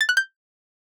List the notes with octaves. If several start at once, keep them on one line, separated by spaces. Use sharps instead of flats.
A6
F#6
G6